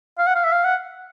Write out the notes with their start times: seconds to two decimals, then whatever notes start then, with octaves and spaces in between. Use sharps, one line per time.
0.18 F5
0.27 F#5
0.35 F5
0.44 E5
0.53 F5
0.65 F#5